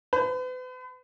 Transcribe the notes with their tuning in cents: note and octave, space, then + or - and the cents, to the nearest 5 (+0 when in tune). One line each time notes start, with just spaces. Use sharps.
B4 +40